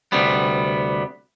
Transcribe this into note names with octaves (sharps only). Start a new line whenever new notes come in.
D2 C3 G3 B3